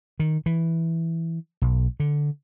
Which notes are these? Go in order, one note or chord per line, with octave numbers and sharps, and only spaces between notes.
D#3
E3
B1
D3